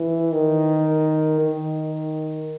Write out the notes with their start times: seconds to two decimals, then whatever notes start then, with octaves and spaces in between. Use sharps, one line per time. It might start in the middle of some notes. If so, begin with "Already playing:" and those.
Already playing: E3
0.32 D#3
1.40 D#3